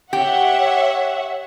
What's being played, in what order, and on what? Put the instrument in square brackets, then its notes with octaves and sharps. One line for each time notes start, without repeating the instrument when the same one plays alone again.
[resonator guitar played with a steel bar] G4 [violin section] C#5 E5 F#5